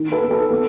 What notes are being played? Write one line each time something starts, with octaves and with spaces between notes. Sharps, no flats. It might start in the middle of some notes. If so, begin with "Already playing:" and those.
Already playing: D#3
A4 B4
B3
A4
B3